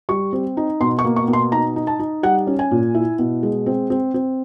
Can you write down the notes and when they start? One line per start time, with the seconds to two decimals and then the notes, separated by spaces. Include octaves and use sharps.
0.09 G3 C#6
0.33 C4
0.57 D#4
0.81 B2 C6
0.99 C#6
1.05 A#3
1.16 C#6
1.28 B2
1.33 C6
1.52 D#4 A#5
1.76 D#4
1.87 A5
1.99 D#4
2.23 G3 F#5
2.47 C#4
2.59 G#5
2.71 A#2
2.95 E4
3.19 B2
3.43 G#3
3.66 C4
3.90 C4
4.14 C4